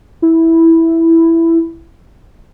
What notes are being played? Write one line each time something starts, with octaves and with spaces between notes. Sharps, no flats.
E4